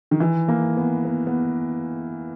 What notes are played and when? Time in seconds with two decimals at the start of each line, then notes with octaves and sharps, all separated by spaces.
0.11 D#3
0.20 E3
0.48 A#3
0.77 B3
1.05 B3
1.27 B3